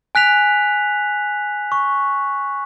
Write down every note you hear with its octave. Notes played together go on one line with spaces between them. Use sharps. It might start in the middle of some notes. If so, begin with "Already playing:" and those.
G#5 F#6 B6 F7
C#6